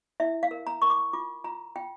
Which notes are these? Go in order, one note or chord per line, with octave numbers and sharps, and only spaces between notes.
E4 E5
F5
A#4
A#5
A#4 C#6
D6
F4 D6
F4 A#5
F4 G5